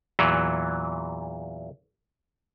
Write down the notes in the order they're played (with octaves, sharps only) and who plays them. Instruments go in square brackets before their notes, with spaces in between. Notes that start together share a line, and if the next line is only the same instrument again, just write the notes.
[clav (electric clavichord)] E2 A#2 E3 F#3